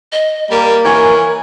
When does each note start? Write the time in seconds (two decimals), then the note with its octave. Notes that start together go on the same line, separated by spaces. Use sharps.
0.12 D#5
0.50 G3 A#3 A#4
0.85 E3 C#5 G#5